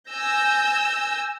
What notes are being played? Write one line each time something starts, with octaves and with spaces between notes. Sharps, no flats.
G#5 E6 G6 A#6